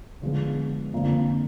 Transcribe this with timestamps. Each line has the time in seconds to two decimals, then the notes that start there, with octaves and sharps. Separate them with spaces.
0.22 D3 F3 G#3 B3
0.93 F2 D3 F3 A#3 D4